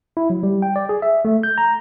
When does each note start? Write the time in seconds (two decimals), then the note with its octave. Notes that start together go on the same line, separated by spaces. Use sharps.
0.17 E4
0.30 F#3
0.43 G3
0.62 G5
0.76 D5
0.89 G#4
1.02 E5
1.25 A3
1.43 G6
1.58 A#5